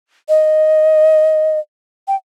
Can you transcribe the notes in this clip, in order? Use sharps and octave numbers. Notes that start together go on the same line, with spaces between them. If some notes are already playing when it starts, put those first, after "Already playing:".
D#5
G5